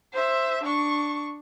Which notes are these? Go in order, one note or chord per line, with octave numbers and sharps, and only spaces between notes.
C5 E5
D4 C#6